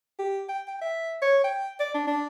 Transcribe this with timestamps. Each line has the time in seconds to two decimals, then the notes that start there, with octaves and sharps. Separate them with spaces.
0.19 G4
0.49 G5
0.68 G5
0.81 E5
1.22 C#5
1.44 G5
1.80 D5
1.94 D4
2.07 D4